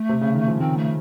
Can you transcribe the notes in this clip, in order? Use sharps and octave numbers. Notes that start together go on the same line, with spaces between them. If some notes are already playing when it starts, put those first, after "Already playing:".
Already playing: A3
C3
C#3
D#3
F3
D#3 C4
A3